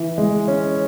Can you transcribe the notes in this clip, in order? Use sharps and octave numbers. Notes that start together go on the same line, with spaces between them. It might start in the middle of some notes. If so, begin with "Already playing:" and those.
Already playing: E3
G#3
C#4